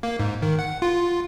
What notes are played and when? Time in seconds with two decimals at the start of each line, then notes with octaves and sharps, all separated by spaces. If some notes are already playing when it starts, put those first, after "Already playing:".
0.03 A#3
0.19 G#2
0.42 D#3
0.59 F#5
0.82 F4